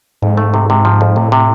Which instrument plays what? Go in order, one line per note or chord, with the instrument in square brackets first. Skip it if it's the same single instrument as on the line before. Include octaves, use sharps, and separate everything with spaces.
[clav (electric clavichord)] F2 [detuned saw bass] G#2
[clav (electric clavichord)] A3
C3
C3
F3
F2
[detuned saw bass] A2 [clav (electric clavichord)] C3
[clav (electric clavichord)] C3